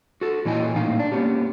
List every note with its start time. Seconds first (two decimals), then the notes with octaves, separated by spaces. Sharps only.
0.21 F#4 A4
0.45 A#2 E3 E4 D#5 G#5
0.76 A2 A#3 D#4 F5
0.99 D4
1.12 A#3 B3 C#4 G4